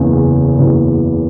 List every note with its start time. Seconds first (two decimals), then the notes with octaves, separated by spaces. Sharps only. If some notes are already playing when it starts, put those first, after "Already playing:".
Already playing: F#1 E2 C#3
0.58 F#1 E2 C#3